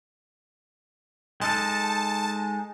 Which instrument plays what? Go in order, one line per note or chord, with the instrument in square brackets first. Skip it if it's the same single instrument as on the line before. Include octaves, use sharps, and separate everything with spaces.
[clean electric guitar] G#3 D#4 A4 [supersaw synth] A5